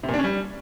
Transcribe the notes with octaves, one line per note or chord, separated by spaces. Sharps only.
C3
A#2
D4
C#4
G3